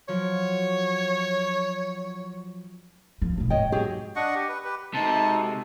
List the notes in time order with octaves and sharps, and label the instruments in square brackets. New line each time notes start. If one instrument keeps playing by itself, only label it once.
[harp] F3 F#3 [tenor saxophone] C#5
[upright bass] F3
F1 B1
[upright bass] G#2 [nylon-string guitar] C#5 D#5 G5
[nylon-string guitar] F#3 G4 G#4
[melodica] D4 D#5 F#5 C#6
G4
B4
G4 B4
[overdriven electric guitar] C3 [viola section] G#3 F#4 A4 [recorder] D#4 [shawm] A5